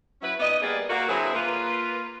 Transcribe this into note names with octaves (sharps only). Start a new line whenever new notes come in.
F#3 C#4 E4 B4
A#2 B3 D#4 D5 D#5
G3 A#3 B3 G#4 A#4 D5
A#3 F#4
D3 F#3 C4 E4 G#4 B4
A#3 F4 B4